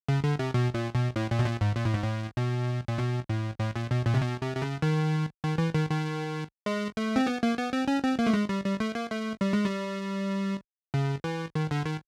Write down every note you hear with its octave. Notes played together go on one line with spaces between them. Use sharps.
C#3
D3
C3
B2
A#2
B2
A2
A#2
B2
A#2
G#2
A#2
A2
G#2
A2
B2
A#2
B2
A2
A2
A#2
B2
A#2
C3
B2
C3
C3
C#3
D#3
D#3
E3
D#3
D#3
G#3
A3
C4
B3
A#3
B3
C4
C#4
C4
A#3
A3
G#3
G3
G3
A3
A#3
A3
G3
G#3
G3
C#3
E3
D#3
D3
D#3